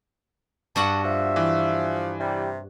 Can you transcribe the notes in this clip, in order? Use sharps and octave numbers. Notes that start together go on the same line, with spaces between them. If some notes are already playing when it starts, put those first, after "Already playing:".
G2 F#4 F#5 A5
F3 E5
E3
C3 G3